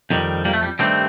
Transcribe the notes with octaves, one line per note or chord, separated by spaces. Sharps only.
F2 D#3 G3
G3 A#3
A3
G3
G2 D#3 G3 A3 C4